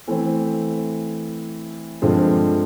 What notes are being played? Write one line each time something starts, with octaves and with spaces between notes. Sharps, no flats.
E3 A3 C4
G2 D3 F3 G#3 C4